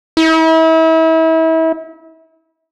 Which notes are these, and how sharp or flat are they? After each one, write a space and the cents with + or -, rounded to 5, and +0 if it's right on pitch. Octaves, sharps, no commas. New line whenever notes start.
E4 -35